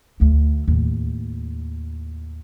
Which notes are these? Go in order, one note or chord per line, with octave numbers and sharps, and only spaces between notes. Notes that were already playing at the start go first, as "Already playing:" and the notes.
D2 A3
D#2 A2